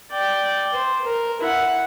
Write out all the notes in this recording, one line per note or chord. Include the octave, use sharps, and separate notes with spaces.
D5 G5
C5
A#4
E4 F#5